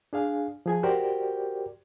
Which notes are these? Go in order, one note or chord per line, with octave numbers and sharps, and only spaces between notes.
D4 G#4 F5 G#5
F3 G#4 G#5
F#4 G4 A#4 C5 D5 G5